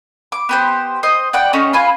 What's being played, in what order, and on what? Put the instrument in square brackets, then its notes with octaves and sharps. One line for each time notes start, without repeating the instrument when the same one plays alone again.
[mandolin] D6
B3 G4 C5
C5 D#5
D5 F#5 G5 D6
A3 C#4 D#4
F4 B4 G#5